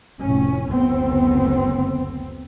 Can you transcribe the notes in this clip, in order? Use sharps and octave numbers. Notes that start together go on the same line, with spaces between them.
F1 A2 C#4
F#1 D2 B3 C4